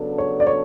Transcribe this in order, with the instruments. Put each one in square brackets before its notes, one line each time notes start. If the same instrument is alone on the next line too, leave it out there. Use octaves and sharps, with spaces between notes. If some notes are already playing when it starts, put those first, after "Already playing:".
Already playing: [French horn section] C#3 F#3 B3 D4 A4
[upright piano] C#5
D5
C#5